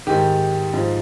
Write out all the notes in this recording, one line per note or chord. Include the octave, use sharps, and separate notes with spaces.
G#2 D#3 G4
G#2 F3